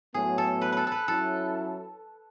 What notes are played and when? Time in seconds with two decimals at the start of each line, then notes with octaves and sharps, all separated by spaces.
0.14 A2 F#3 B3 G#4
0.38 A4
0.61 B4
0.72 A4 B4
0.87 A4 B4
1.08 F#3 C#4 E4 A4